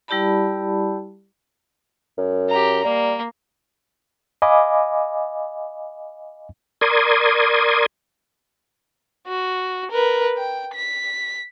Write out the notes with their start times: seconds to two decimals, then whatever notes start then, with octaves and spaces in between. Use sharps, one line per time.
0.08 G3 E4 G4 D5 A5 B5
2.18 F#2
2.49 G4 A#5
2.84 G3 A#3
4.42 D#5 F5 G#5 B5 D6
6.81 A#4 D5 C6 D#6 G#6
9.28 F#4
9.91 A#4 B4
10.37 G5
10.74 B6